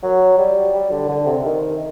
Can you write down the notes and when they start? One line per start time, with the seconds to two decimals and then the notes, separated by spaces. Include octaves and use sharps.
0.03 F#3
0.38 G3
0.74 G3
0.91 D3
1.09 D3
1.26 C3
1.44 D#3